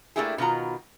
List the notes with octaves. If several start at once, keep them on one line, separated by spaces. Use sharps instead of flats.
A3 A#3 D4 E4 G4 G#4
B2 D#3 F4 F#4 A#5